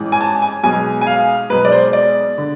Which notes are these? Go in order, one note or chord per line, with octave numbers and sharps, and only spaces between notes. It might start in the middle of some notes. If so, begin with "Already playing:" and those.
Already playing: A1 G#2 E3
G#5
A5
G#5
B1 B2 G#3 G#5
G#5
F5
B1 B2 G#3 B4
D5
C5
D5
D3